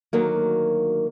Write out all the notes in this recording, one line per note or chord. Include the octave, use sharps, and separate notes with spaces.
D2 D#3 F#3 A#3